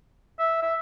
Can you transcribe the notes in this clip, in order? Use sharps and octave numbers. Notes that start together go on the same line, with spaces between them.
E5
E5